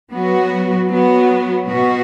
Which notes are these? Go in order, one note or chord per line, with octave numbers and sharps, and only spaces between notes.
F#3 B3 F#4
F#3 B3 F#4
B2 B3 F#4